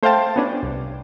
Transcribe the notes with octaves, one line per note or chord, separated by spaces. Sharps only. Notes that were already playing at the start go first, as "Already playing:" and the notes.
A3 C5 E5 F5 G5 A5
B3 C#4 D4
C2